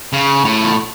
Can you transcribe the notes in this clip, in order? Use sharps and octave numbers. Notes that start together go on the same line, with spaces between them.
C#3
A2
E2